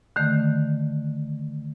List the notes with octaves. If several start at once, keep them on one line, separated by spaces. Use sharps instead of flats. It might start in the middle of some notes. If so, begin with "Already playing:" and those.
D3 D#3 A3